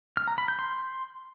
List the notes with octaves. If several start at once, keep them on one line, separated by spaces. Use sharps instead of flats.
F6
A#5
B5
G6
C6